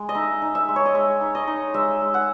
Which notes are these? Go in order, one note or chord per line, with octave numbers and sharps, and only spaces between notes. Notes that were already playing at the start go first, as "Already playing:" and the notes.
Already playing: G#3
D#5
D#4 E5
D#4
E5
G#3
C#5
D#5
G#3 E5
D#4
D#5
D#4
G#3 E5
G#3
F#5